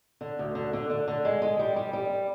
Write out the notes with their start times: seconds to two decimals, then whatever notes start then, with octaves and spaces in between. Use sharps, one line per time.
0.21 D3
0.39 D2
0.55 D3
0.73 D3
0.90 D3
1.08 D3
1.25 G#3
1.42 G#3
1.59 G3
1.76 G3
1.93 G3